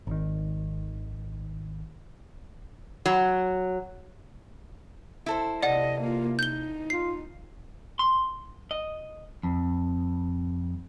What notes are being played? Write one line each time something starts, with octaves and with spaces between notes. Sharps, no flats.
G#1 D#3
F#3
E4 A4 C5
C3 D5 D#5 F#5
A#3 F4
D#4 G6 G7
F4 C7
C6
D#5
F2